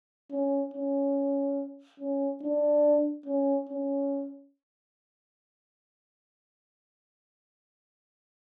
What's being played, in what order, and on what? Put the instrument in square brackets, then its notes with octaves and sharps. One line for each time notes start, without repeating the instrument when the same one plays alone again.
[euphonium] C#4
C#4
C#4
D4
C#4
C#4